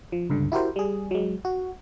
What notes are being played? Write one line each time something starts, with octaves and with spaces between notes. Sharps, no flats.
F3
C#2 G2 D3
E4 F#4 G4 A#4 C5
G3 G#4
F#3 G#3
F#4